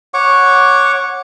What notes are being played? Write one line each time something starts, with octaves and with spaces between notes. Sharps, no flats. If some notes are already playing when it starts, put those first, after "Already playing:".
C#5 F#5 C#6 D6